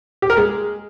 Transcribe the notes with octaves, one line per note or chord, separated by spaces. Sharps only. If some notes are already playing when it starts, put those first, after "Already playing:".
G4
A#4
G#3